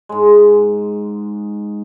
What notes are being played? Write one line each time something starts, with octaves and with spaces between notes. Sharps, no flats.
G#2 G#3